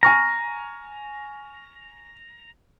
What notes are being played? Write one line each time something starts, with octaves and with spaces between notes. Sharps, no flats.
G#5 A#5 C#6 F6